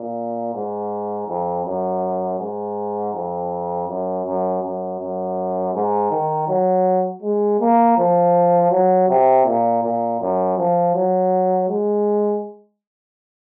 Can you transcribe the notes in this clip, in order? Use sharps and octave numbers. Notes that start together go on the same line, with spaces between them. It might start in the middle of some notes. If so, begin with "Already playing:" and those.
Already playing: A#2
G#2
F2
F#2
G#2
F2
F#2
F#2
F#2
F#2
G#2
D#3
F#3
G#3
A#3
F3
F#3
C3
A#2
A#2
F#2
F3
F#3
G#3